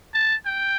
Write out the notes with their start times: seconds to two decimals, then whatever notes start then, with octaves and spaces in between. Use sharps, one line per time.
0.14 A5
0.45 G5